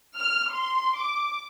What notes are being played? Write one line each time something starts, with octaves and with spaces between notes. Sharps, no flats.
F6
C6
D6